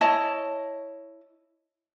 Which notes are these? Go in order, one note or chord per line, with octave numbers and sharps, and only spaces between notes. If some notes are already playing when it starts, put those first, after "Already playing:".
E4 C#5 D#5 A5